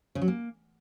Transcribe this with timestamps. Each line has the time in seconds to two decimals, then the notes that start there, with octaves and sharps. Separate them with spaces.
0.15 C#3
0.22 F#3
0.28 A#3